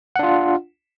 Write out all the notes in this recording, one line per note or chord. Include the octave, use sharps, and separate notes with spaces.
D4 F4 F#5